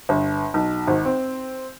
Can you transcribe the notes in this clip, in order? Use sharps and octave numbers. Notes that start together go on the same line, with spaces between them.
G1
B1
G#1
C4